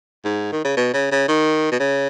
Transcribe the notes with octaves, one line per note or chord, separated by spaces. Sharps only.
G#2
D#3
C#3
B2
C#3
C#3
D#3
B2
C#3